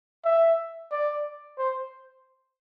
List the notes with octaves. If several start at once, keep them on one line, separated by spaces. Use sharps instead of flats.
E5
D5
C5